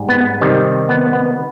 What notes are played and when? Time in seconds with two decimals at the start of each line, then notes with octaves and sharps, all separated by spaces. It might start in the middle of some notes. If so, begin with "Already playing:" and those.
Already playing: G#2 G3
0.09 B3
0.41 C3 D#3 G3
0.89 B3
1.13 B3